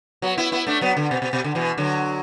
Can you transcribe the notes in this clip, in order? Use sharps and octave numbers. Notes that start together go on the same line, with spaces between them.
F#3 B3
B3 E4
B3 E4
A3 D4
F#3 B3
D3
B2
B2
B2
D3
B2 E3
D3 F#3